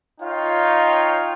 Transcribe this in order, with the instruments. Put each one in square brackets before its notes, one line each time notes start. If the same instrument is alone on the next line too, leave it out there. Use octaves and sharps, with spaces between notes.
[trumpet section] D#4 F4 C#5 F5 G5